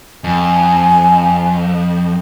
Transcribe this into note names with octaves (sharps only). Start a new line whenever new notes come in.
F2 G#5